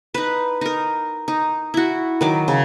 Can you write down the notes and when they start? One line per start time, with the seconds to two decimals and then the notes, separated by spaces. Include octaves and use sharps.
0.14 D#4 B4
0.61 D#4 A#4
1.28 D#4
1.74 E4 F#4
2.21 D#3 F#3 D6
2.48 C#3